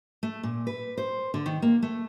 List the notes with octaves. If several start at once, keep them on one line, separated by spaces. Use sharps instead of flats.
A3
A#2
B4
C5
D3
D#3
A#3
A3